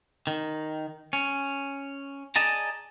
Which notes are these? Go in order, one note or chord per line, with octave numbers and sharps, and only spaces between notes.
D#3
C#4
G#4 D5 D#5 A5 A#5